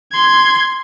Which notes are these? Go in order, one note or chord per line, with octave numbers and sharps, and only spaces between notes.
C6 G#6